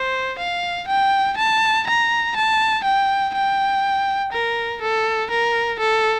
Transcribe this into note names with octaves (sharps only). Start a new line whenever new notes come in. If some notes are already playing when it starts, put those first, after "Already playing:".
Already playing: C5
F5
G5
A5
A#5
A5
G5
G5
A#4
A4
A#4
A4